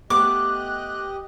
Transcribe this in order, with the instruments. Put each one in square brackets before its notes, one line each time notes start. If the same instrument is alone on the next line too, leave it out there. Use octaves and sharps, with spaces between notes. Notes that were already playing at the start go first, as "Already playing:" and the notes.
[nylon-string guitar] A3 B3 [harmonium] G4 D#5 [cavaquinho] D6 [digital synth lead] F#6